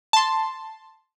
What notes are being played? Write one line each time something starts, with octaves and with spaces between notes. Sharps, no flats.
A5 C6